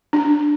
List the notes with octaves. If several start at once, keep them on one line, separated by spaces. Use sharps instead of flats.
D4